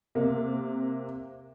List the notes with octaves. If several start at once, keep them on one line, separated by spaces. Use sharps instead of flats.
C3 A#3